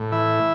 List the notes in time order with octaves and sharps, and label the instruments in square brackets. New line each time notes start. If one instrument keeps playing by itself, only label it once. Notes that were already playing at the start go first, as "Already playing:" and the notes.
Already playing: [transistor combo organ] A2
E3 E5